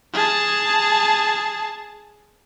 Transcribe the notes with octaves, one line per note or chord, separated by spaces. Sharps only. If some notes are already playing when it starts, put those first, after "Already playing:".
G#4 A5